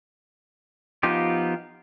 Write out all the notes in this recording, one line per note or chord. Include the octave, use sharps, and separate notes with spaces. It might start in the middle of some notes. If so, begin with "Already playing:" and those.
F3 B3 D#4 F4 G4